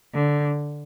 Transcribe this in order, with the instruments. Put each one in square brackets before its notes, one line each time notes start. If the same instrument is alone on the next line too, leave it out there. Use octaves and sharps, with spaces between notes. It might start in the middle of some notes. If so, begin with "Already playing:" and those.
[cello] D3